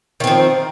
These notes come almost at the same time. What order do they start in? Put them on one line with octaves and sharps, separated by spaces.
D#3 C4 F3